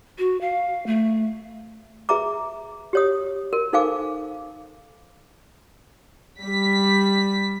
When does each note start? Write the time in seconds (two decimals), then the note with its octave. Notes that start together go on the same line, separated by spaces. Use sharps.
0.18 F#4
0.41 F5
0.86 A3
2.09 G#4 B4 E5 A#5 D6
2.93 G4 C#5 D#6
3.53 A#4
3.73 D#4 A4 C5 F5 G#5 D6
6.43 G3 B6